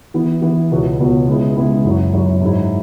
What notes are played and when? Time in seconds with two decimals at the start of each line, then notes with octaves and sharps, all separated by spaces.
0.14 E3 B3 E4
0.41 E3 B3 E4
0.71 C#2 B2 B3 F#4 C#5
0.99 C#2 B2 B3 F#4 C#5
1.27 C#3 G#3 B3 E4
1.57 C#3 G#3 B3 E4
1.85 F#2 F#3 E4 C#5
2.13 F#2 F#3 E4 C#5
2.42 G#2 F#3 E4